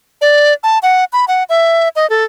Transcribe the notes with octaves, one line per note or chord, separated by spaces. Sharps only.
D5
A5
F#5
B5
F#5
E5
D#5
A4